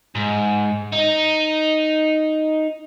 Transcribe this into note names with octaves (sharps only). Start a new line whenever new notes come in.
G#2
D#4